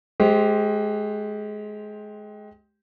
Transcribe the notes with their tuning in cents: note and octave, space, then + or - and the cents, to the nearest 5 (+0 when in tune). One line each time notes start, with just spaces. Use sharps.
G#3 +25 G4 +0 C5 +0